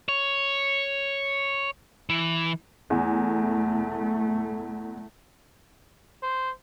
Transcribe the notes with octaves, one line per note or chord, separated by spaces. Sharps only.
C#5
E3
E2 A3
C5